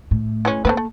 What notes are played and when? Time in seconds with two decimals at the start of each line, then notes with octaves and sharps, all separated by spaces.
0.11 A2
0.45 E3 G#3 C#4
0.65 A3 A#3 C4 B4
0.77 A3